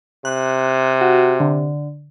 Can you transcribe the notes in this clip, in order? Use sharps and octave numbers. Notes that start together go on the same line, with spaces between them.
C3 F#6
F#4
D3